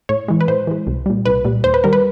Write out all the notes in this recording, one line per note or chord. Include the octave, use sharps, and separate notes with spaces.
A2 C#5
E3 G#3
B4
A2 C5
E3 G#3
C2
A#2 G3
C2 B4
A#2 G3
D#2 C5
B4
D#3 G3 A#4
B4